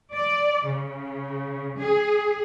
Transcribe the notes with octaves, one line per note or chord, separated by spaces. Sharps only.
D5
C#3
G#4